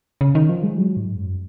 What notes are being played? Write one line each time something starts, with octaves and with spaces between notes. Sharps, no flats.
C#3
D#3
F3
G#3
F#3
G#2
F#2